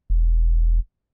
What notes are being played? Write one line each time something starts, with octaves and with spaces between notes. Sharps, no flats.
E1